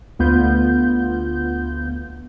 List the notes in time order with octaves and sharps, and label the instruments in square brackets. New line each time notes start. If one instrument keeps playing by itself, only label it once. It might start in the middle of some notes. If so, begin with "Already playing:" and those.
[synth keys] D2 B3 F4 G6